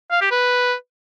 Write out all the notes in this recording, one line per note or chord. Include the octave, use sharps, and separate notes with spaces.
F5
G4
B4